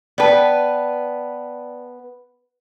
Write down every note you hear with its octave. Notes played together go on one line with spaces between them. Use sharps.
B3 B4 D5 G5 A5